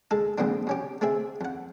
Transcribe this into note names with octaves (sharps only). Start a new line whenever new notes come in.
G#3 G#4 A4
A#1 F2 G#2 B2 D3 C4
B2 C#4 G4
A3 C4 G#4 E5
F2 F#5